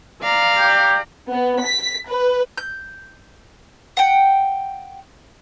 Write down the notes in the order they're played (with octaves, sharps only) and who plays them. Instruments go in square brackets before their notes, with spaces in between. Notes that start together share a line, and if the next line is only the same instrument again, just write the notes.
[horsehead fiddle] D5 A#5 [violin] F5
[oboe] G4
[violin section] B3
B6
B4
[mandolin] G6
F#5 G5